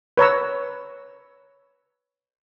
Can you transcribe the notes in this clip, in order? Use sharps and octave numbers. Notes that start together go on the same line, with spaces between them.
B4 C#5 A#5 E6